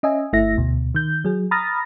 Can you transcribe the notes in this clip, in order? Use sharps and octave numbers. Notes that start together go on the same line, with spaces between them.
C#4 D#5 E5 G#5
G1 A3 E4 E5 A#6
D2 B2
D#3 G6
F#3 G#4
A#5 B5 D#6 F6 A6 A#6